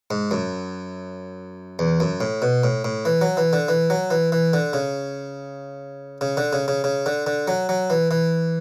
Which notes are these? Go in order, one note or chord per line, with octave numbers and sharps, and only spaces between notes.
G#2
F#2
E2
F#2
A2
B2
A2
A2
E3
F#3
E3
D3
E3
F#3
E3
E3
D3
C#3
C#3
D3
C#3
C#3
C#3
D3
D3
F#3
F#3
E3
E3